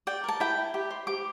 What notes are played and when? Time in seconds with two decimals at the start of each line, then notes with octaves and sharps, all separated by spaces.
0.07 D5 G5
0.24 A#4 A5
0.40 E4 G5
0.57 E4
0.74 G4
0.91 C5
1.07 G4 D6